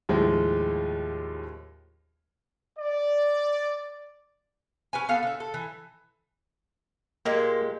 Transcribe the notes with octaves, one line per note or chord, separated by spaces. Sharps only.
D#2 A2 F3 G#3
D5
C#4 B4 G#5
B3 A4 F5
D3 E5
A4
E3
A#2 G#3 A#3 G4